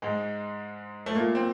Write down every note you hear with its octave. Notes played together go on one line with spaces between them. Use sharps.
G#2 G#3
A3
A#2 A#3
C4